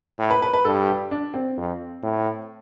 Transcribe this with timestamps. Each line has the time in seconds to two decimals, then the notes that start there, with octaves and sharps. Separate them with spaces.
0.19 A2
0.30 B4
0.42 B4
0.53 B4
0.65 G2 A4
0.89 G4
1.11 D4
1.34 C4
1.58 F2
2.03 A2